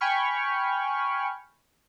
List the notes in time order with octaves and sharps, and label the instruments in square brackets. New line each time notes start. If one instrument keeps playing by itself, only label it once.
[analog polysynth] G5 G#5 B5 C#6 F6